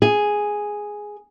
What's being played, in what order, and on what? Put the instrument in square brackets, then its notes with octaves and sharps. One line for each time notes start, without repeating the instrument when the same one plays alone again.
[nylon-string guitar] G#4